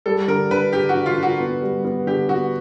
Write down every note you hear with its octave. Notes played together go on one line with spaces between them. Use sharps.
G3 A4
D3 A#4
D3 B4
D3 G4
F#4
D3
F4
D3
F#4
B3
G3
B3
D3 G4
B3 F#4